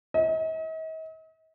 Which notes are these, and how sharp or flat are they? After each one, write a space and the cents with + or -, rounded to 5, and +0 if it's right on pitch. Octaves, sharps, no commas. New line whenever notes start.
D#5 +45